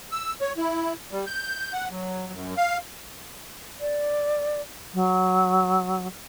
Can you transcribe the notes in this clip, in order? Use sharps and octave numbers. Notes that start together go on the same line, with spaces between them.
E6
C#5
E4
G3
G6
F#5
F#3
F#2
F5
D5
F#3